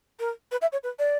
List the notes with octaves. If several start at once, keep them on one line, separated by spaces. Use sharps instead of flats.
A#4
B4
E5
C#5
B4
D5